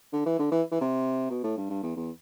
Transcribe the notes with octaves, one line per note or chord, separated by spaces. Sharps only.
D3
E3
D3
E3
E3
C3
B2
A2
G2
G2
E2
E2